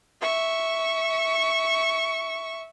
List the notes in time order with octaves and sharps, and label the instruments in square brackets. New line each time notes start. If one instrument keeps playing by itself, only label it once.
[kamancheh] E5 C#6